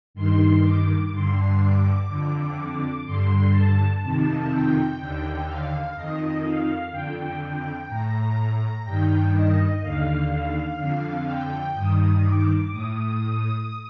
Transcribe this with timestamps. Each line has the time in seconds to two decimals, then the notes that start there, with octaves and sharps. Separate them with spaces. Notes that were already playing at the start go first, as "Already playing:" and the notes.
0.14 G2 D#3 C6
0.63 D6
1.11 G2 D3 C6
1.59 D6
2.08 F2 D3
3.05 G2 D3 C6
3.53 A5
4.02 F2 C3 D#3 A5
4.50 G5
4.98 D#2 D3
5.46 F5
5.95 F2 D#3 D#5
6.43 F5
6.91 F2 D3 G5
7.40 G5
7.88 A2 A#5
8.84 G2 G5
8.89 D#3
9.33 D#5
9.82 D#2 D3 F5
10.30 F5
10.78 F2 D3
11.26 G5
11.74 G2 D#3 D#6
12.23 D6
12.71 A2 D#6